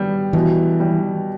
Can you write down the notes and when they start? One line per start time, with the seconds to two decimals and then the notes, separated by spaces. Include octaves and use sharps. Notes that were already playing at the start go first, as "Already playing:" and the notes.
Already playing: G3 B3
0.33 B2 E3
0.80 G3